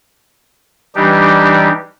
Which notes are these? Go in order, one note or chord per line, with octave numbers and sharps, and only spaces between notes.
E3 G3 D4 D#4 G4